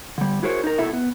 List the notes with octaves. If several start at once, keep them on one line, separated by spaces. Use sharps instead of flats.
D3 G3
E4 F#4 G#4 A#4 C5 C#5
D#4 A#4
B2 E4 A4 E5
B3